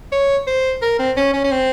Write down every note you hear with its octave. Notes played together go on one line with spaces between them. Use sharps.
C#5
C5
A#4
C4
C#4
C#4
C#4
C4